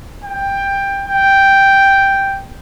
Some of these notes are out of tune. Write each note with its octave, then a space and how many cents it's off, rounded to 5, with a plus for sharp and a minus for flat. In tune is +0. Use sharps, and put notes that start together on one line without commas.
G5 +15
G5 +0